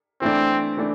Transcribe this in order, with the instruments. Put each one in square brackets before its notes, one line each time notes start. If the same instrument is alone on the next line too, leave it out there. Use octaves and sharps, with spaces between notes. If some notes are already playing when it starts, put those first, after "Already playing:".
[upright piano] E3 A3 D4 [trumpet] C4
[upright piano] E3 A3 D4